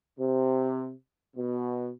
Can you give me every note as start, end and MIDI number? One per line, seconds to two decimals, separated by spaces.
0.19 0.92 48
1.37 1.90 47